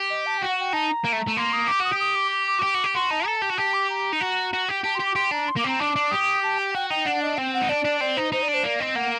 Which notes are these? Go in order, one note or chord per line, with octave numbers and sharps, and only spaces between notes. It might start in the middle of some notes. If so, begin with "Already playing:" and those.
Already playing: G4
D#5
A5
F#4 G5
F#5
G5
D#4 A5
A#5
A#3
A3
A3
A#3 C6
D#6
G4 D6
F#4 D#6
G4
D#6
D6
D6
D6
F#4
G4
F#4
G4
F#4 C6
D#4 A5
A4 A#5
A5
G4
F#4
G4 A5
D6
A#5
D#4
F#4
F#4
G4
G4 A5
C6
G4
D6
G4 C6
D4 A#5
C6
A#3 D6
C4 A#5
D4 D6
D4
G4 D#6
A5
G5
F#4 G5
D#4 G5
D4 F#5
D#5
C4 G5
F#5
D#4
D4 D5
D4
C4 D5
D#4 C5
D#4 C5
D5
D4
C5
A#3 D5
C4 D#5
A#3 F#5